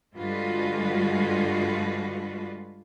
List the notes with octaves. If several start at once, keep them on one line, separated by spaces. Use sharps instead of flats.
G2 D3 G#3 F4 F#4 B4